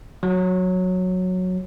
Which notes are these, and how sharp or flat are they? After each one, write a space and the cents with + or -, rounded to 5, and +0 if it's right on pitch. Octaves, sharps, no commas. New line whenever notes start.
F#3 -10